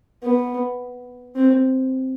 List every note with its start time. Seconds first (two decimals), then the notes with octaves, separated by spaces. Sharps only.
0.23 B3
1.35 C4